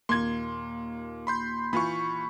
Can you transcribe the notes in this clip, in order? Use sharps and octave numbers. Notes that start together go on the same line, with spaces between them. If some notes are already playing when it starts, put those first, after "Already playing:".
D#2 A#2 A#3 C6 G#6
B5 C6 G6
E3 F4 B5 C#6